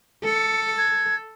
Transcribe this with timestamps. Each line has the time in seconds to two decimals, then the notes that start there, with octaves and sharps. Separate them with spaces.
0.24 A4 C#7
0.78 G#6